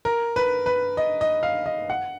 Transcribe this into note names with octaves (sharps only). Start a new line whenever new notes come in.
A#4
B4
B4
D#5
D#5
F5
D#5
F#5